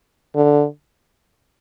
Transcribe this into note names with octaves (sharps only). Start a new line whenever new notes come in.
D3